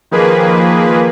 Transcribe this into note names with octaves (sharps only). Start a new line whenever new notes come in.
D#3 F3 A#3 G#4 B4